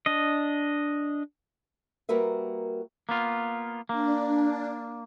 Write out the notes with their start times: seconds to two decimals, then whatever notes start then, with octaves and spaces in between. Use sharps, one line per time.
0.06 D4 D#5
2.09 G3 A#3 F#4 A#4 B4 E5
3.09 A#3 B3 F4
3.89 A#3 D4